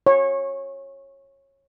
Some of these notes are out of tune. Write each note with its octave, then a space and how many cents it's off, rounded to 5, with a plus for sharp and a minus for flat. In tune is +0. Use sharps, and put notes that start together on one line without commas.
C#5 -20